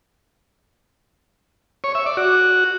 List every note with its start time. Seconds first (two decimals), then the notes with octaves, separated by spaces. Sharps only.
1.84 C#5
1.95 E5
2.06 D5
2.17 F#4